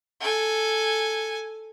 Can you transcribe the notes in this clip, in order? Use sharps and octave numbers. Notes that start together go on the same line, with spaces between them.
A4 G#5